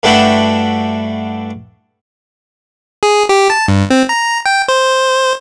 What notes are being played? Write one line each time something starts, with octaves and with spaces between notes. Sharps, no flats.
G2 A3 D4 E4 F#4 G5
G#4
G4
A5
G2
C4
A#5
G5
C5